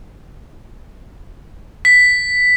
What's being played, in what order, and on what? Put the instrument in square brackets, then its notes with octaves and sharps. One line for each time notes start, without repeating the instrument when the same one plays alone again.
[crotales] B6